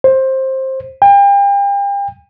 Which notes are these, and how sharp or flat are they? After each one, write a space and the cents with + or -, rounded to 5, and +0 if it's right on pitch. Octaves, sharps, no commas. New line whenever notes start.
C5 +15
G5 +35